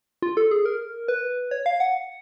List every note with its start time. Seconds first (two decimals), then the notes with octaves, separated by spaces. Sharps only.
0.22 F4
0.37 A4
0.51 G#4
0.65 A#4
1.08 B4
1.51 C#5
1.66 F5
1.80 F#5